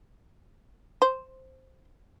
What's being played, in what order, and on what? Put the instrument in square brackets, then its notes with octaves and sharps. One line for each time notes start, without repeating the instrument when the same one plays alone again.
[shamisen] C5